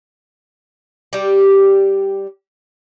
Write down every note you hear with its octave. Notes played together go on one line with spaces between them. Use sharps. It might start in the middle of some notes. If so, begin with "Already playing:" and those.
G3 G4